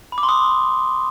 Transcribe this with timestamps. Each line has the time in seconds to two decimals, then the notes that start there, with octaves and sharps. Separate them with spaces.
0.12 B5
0.18 D6
0.23 C6
0.29 D#6